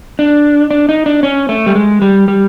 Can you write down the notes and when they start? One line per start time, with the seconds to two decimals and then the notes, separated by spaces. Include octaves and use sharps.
0.19 D4
0.71 D4
0.89 D#4
1.06 D4
1.23 C#4
1.49 A3
1.66 G3
1.75 G#3
2.02 G3
2.28 G3